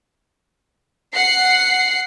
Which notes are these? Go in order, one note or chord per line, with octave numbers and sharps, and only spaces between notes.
F#5 C7